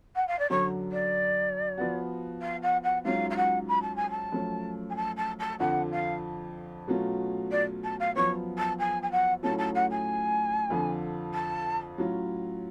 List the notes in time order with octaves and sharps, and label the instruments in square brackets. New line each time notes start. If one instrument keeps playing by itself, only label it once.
[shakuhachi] F#5
F5
D5
[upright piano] F#2 D3 F#3 [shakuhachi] C#5
[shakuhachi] D5
[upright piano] F3 B3 F#4
[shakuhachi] F5
F#5
F#5
[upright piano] G#2 F#3 C#4 F4 [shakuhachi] F5
[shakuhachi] F5
F#5
B5
A5
G#5
A5
[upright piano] F#2 F3 A3 C#4
[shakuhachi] G#5
A5
A5
A5
[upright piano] F2 D3 F3 [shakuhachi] F#5
[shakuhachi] F5
[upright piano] B2 F#3 A3 C#4 F4
[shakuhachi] D5
A5
F5
[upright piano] F#2 F3 B3 [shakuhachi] C#5
[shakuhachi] A5
G#5
G#5
F#5
[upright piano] A2 F#3 A3 C#4 F4 [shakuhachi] A5
[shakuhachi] A5
F#5
G#5
[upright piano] F2 D3 F3
[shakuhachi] A5
[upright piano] A2 F#3 C#4 F4